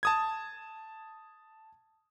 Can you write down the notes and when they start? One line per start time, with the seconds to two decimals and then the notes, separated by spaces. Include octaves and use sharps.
0.03 A5 D#6 G#6